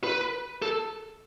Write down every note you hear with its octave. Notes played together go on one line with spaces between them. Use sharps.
B4
A4